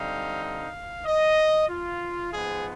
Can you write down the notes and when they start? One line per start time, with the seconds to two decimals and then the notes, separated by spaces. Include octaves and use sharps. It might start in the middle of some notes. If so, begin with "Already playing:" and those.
Already playing: D3 G3 C4 D#4 F5
0.42 F5
1.06 D#5
1.69 F4
2.33 G#2 F3 G#3 B3 G#4